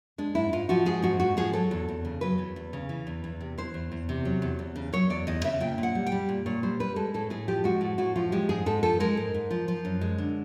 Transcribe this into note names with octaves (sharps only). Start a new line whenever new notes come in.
G#3 D4
G#2 E4
G#2 F4
F3 F#4
G#3 G#4
G#2 F#4
G#2 F#4
F3 G#4
F#3 A4
E2
E2
C#3
F#3 B4
E2
E2
C#3
E3
E2
E2
C3
E3 C5
E2
E2
C3
F#3
E2
E2
C#3
F#3 C#5
E2 D5
E2 D#5
C#3 E5
A#2 G5
A#2
F#5
G3
G5
G3
A#2
A#2 C#5
G3 C5
G3 B4
G#3 A4
A2 A4
A2 G#4
F3 G4
G#3 F#4
A2
A2 F#4
F3 F4
G#3 G4
G#2 G#4
G#2 A4
F3 A4
G#3 A#4
G#2
G#2
F3
F3
F#2
G#3
D3